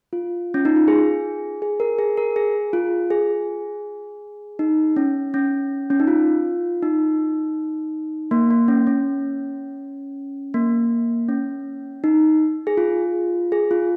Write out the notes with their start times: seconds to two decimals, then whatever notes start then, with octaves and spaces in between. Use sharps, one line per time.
0.13 F4
0.54 C#4
0.65 D#4
0.76 F4
0.88 G#4
1.62 G#4
1.80 A#4
1.99 G#4
2.17 A#4
2.36 G#4
2.73 F4
3.10 G#4
4.59 D#4
4.96 C#4
5.34 C#4
5.90 C#4
6.00 D#4
6.07 F4
6.83 D#4
8.31 A#3
8.50 A#3
8.68 C#4
8.87 C#4
10.54 A#3
11.29 C#4
12.04 D#4
12.67 G#4
12.77 F4
13.52 G#4
13.71 F4